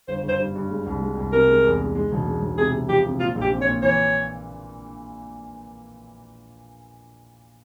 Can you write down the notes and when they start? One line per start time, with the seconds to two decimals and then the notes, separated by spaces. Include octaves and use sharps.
0.08 G1 C5
0.23 G1
0.29 C5
0.39 G2
0.56 G2
0.70 G#3
0.86 C2
1.01 G#3
1.17 C2
1.32 C3 A#4
1.48 G#3
1.64 E2
1.80 G#3
1.95 G#3
2.12 E1
2.26 G#3
2.42 E1
2.58 C3 G#4
2.73 C3
2.89 F3 G4
3.05 C3
3.20 A#2 F4
3.35 A#1
3.41 G4
3.52 C4
3.61 C#5
3.67 A#2
3.82 E3 C#5